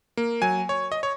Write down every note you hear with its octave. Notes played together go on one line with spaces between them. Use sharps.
A#3
F#3 G#5
C#5
D#5
C#5